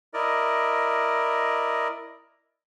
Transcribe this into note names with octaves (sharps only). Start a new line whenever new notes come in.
E4 A#4 D5 D#5